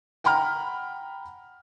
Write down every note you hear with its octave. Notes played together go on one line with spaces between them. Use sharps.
F#5 G5 A#5 B5 F6